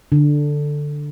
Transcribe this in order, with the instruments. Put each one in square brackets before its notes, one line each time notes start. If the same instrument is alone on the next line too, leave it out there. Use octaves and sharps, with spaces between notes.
[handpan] D3